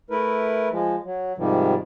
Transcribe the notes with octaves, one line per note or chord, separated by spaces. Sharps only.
A3 E4 A#4 B4
F3 G#3
F#3
G#2 C3 D#3 F3 G3